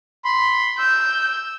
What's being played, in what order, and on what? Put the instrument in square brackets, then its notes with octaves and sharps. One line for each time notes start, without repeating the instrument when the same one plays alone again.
[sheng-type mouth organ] B5 C6
[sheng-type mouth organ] E6 [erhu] G6